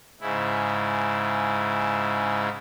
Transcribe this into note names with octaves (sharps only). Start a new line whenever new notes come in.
G#2 C#3 E4